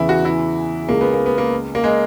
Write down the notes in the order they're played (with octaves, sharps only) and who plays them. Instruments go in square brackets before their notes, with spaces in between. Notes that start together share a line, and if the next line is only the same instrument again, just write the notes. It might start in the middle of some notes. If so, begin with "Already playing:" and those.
Already playing: [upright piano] E2 C#3 E3 [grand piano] E4
[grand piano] F#4
E4
[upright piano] C#2 C#3 G#3 [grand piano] A#3
[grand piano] B3
A#3
B3
A#3
A#3
G#3